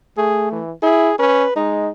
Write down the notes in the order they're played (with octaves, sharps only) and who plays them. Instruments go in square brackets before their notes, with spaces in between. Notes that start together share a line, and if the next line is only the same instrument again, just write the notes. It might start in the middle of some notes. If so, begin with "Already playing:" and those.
[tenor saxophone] A3 [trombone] G#4
[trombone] E3
[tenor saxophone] E4 [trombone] G#4
[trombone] C#4 [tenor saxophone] B4
[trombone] G#3 [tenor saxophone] D#4